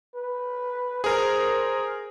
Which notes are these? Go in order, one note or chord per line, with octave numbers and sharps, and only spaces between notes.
B4
G#4 A#4 C5